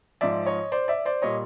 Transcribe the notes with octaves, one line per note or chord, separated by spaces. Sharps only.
G#2 F3 D5 E5
C#5 D#5
C5 D5
D5 E5
C5 D5
A#2 G3 C#5 D#5